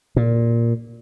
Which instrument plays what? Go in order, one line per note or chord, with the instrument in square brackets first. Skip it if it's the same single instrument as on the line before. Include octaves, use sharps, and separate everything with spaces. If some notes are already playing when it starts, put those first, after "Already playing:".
[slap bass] A#2